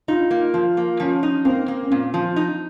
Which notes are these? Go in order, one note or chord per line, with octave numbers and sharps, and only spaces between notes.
D#4 F4
A#3
F3 F4
A#3
F3 C#4
D#4
A#3 C4
A#3
C#4
A#2 C4
F3
D#4